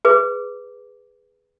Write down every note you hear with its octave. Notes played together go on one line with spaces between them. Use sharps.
G#4 B4 D6